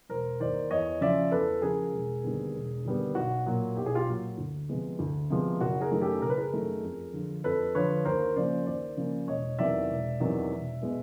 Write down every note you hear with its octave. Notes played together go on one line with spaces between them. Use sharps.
E1 A#4 C5
D#2 D#3 C5 D5
E2 C#5 D#5
C#3 F3 D5 E5
E2 A4 B4
C#3 F3 G#4 A#4
E1
D#2 D3 G3 B3
E1
D#2 D3 G3 B3
B1 F#4
A#2 F#3
B1 G4
G#4
F4 G4
A#2 F#3
D2
C3 F3 G#3 B3
D2
C3 F3 G#3 B3
F#1 F#4
G#4 A#4
F#2 D#3 F#3 A3
G4 A4
F#1 A#4
B4
G#4 A#4
F#2 D#3 F#3 A3
F2
D3 F3
F2 A4 B4
D3 F3 B4 C#5
D#2 A#4 C5
C#3 F3 A#3 C5 D5
D#2 C5 D5
C#3 F3 A#3
E1 C#5 D#5
E2 C3 D#3 F#3 D5 E5
E1
E2 C3 D#3 F#3
E1
B2 G#3 B3